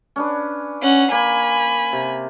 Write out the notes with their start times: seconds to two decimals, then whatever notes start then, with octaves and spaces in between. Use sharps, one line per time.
0.16 C#4 D4 B4
0.82 C#4 F#5
1.11 A#3 G#5 B5
1.93 C3